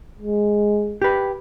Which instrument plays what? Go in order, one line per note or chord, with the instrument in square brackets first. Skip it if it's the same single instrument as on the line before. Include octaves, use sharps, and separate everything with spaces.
[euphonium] G#3
[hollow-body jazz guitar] G4 B4